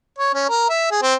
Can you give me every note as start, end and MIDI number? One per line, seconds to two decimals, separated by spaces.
0.18 0.32 73
0.34 0.46 61
0.49 0.66 70
0.69 0.89 76
0.91 1.00 68
1.02 1.15 60